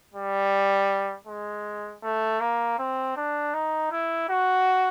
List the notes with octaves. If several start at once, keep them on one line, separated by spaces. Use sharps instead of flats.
G3
G#3
A3
A#3
C4
D4
D#4
E4
F#4